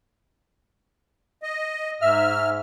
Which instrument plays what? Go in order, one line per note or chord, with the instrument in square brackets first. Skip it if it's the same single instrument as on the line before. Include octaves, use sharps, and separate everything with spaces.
[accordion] D#5
[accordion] G#2 F6 [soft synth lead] E5